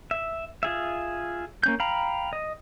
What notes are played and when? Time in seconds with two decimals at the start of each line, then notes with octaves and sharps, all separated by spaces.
0.11 E5
0.63 F4 G#4 E5
1.63 A#3 C#4 G6
1.80 F5 G5 A#5 B5
2.33 D#5